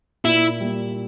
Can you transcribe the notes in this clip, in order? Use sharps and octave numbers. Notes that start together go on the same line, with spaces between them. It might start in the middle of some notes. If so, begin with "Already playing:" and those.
A#2 E4
G3 A#3